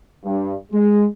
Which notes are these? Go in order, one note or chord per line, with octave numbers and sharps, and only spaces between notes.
G2
G#3